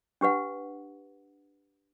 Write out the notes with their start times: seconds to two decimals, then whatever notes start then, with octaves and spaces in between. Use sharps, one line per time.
0.21 D4 G4 B4 F#5